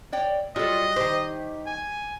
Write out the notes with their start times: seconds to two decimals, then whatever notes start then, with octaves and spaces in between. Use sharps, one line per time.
0.12 C#5 D5 G5
0.56 F#3 G3 F4 A4 D#5
0.96 D#3 G4 C5
1.67 G#5